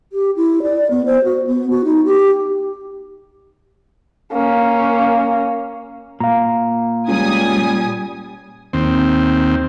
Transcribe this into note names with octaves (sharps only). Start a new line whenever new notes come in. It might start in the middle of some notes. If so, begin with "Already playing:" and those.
G4
E4
D5
B3
C5
F#4
B3
F#4
D#4
G4
A#3 C#4
A#2 F5 A#5
C#2 G3 G#5 D#6
D#2 C4